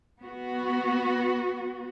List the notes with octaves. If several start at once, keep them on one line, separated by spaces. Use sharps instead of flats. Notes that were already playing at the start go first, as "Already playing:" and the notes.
B3 F#4